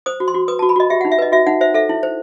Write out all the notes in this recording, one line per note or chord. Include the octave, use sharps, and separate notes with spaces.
C5 D#6
F#4
C6
F#4
B4 D#6
F#4 A5
B5
F#4 D#5
G4 E5
D#4 F#5
E5
B4 D#5
F#4 E5
D#4 F#5
C5 E5
A4 E5
E4
C5